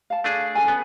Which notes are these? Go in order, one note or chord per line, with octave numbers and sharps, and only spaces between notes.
F5 A5
A3 D4 G#4
C#4 A4 G#5
B3